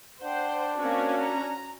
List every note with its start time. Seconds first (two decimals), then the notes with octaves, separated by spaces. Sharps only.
0.23 D4 C5 F#5 G5
0.80 A#3 C4 C#4 F#4
1.20 A#5